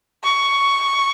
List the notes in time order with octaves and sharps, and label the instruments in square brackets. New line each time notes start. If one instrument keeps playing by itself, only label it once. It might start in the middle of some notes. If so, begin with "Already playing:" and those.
[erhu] C#6